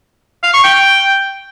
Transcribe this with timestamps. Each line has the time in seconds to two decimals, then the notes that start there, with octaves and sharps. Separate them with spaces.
0.44 F5
0.54 C#6
0.64 G5